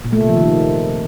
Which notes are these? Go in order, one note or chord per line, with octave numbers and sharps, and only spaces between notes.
A#2
A3
C3
F3
D#3